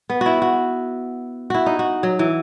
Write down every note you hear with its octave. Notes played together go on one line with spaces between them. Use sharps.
B3
E4 F#4
F#4
E4 F#4
D#4
F#4
F#3
E3